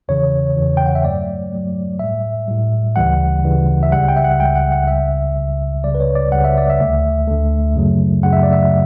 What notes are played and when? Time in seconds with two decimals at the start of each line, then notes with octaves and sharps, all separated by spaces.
0.08 E2 C#3 E3 C#5
0.57 E2 C#3 E3
0.77 G5
0.86 F#5
0.95 E5
1.04 G2 F#3 A3 D5
1.52 G2 F#3 A3
2.00 A2 G3 E5
2.48 A2 G3
2.96 D2 C#3 E3 G3 F#5
3.44 D2 C#3 E3 G3
3.83 E5
3.92 C#2 C#3 G3 F#5
4.08 G5
4.16 E5
4.24 F#5
4.40 C#2 C#3 G3 G5
4.55 F#5
4.72 F#5
4.87 C#2 C#3 G3 E5
5.36 C#2 C#3 G3
5.84 C#2 C#3 G3 D5
5.95 B4
6.00 C#5
6.15 D5
6.32 C#2 C#3 G3 F#5
6.45 E5
6.58 D5
6.70 E5
6.80 D2 D3 A3
7.27 D2 D3 A3
7.75 F#2 C#3 F#3 A3
8.23 F#2 C#3 F#3 A3 F#5
8.33 E5
8.43 D5
8.53 E5